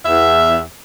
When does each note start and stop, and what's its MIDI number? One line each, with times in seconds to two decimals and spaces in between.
0.06 0.60 40
0.06 0.60 76